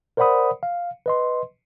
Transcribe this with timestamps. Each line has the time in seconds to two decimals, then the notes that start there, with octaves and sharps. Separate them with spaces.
0.17 A#4 C5 D5 F#5 B5 D#6
0.63 F5
1.06 B4 D#5 C6